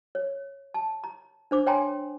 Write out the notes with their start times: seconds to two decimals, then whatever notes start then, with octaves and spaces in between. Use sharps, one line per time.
0.15 C#5
0.74 A5
1.04 A#5
1.51 D4 C5 D6
1.66 C#5 G5 G#5 A#5 C6